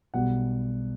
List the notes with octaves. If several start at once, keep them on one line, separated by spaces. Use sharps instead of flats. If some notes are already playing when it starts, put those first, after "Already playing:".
B1 B2 G3 F#5